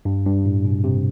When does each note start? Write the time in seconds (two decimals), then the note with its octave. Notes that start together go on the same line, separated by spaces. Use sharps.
0.05 G2
0.26 G2
0.46 A2
0.65 B2
0.84 C3